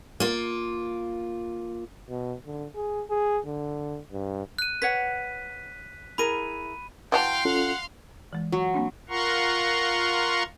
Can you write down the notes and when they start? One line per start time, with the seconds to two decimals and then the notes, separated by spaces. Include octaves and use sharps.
0.20 A#3 F4
2.09 B2
2.46 D3
2.75 G#4
3.10 G#4
3.46 D3
4.12 G2
4.59 F#6 D#7
4.82 B4 C#5 F#5 B6
6.18 E4 G#4 A#4 B5 D#7
7.12 E3 F#4 F5 G5 A5 C6
7.45 C#4 F4 A4 F#5
8.33 E3 G#3
8.52 F#3
8.74 A#3 C4 D4
9.09 F4 A#4 F#5 A#5 C6 C#6